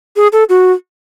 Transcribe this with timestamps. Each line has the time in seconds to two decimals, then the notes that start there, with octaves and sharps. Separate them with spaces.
0.16 G#4
0.33 A4
0.49 F#4